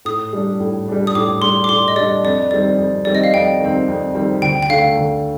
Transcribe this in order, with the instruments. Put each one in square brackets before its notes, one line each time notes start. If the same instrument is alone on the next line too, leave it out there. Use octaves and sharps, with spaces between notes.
[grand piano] A2 [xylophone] D#6
[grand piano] G3 D4
A2
G3 D4
[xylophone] D#6
[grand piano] A2 [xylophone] D6
[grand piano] G3 D4 [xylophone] C6
[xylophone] D6
[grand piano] A2 [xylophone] C6
[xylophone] D#5
[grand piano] G3 D4 [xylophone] D5
[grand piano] F2 [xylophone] D5
[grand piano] D#3 G3 C4 [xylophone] D5
[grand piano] F2
[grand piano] D#3 G3 C4 [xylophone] D5
[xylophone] D#5
F5
[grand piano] F2 [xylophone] G5
[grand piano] D#3 G3 C4
F2
D#3 G3 C4
[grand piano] D2 [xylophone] G5
[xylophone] G5
[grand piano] D3 A3 [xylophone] F5
[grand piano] D2